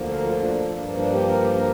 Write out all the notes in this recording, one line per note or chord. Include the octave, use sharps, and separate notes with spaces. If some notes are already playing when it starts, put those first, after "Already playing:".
Already playing: D2 D3 F3 A#3
A#4
F4
D4
G2 F3 A#3
D4
G4
A#4
G4
A#4